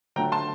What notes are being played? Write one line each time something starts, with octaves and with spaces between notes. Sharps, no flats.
D3 F#3 A3 G5 A#5
A5 C6